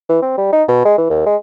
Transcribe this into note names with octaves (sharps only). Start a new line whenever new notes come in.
E3
C4
G3
D#4
B2
G#3
E3
D#2
G#3